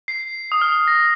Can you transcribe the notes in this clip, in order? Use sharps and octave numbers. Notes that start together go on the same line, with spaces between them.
C7
D#6
F6
A#6